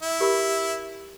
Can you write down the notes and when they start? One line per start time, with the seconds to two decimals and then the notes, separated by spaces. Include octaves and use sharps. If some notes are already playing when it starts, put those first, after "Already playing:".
0.02 E4
0.20 G4 A#4 B5